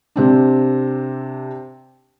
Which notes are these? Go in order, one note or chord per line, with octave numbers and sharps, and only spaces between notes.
C3 C4 D4